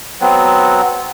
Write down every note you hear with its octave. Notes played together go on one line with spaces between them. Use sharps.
F#3 B3 C4